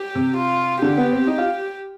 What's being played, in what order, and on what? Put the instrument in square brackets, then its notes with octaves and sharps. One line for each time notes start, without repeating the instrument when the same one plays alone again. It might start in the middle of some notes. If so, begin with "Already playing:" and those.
Already playing: [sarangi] G4
[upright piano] C3
[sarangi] F4
[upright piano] D3 [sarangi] G4
[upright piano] B3
C4
D#4
F4